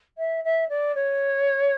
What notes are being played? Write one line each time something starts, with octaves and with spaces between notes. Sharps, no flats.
E5
E5
D5
C#5